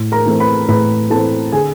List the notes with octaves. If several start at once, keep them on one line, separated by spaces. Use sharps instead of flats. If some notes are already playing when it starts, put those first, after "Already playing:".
Already playing: A2
A#4 A#5
E3 A3 C4
B4 B5
A2 B4 B5
E3 A3 C4 A4 A5
D3 G#4 G#5